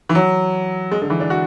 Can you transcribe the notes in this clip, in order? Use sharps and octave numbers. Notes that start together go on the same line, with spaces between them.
E3
F#3
G#3
D3
E3
D4
F#4